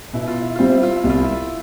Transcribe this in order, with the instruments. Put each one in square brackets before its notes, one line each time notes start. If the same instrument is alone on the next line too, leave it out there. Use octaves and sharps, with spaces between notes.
[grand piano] B2 [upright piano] E4
[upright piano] F4
E4
[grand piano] G3 C4 [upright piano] F4
[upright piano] E4
F4
E4
[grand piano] C2
[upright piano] F4
E4